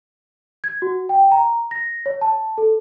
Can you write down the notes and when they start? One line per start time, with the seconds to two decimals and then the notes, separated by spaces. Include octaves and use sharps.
0.64 G#6
0.82 F#4
1.09 G5
1.32 A#5
1.71 A#6
2.06 C#5
2.21 A5
2.58 A4